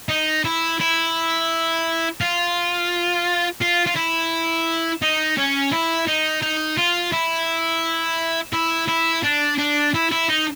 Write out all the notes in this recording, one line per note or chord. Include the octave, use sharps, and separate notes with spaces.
D#4
E4
E4
F4
F4
F4
E4
D#4
C#4
E4
D#4
D#4
F4
E4
E4
E4
D4
D4
E4
E4
D#4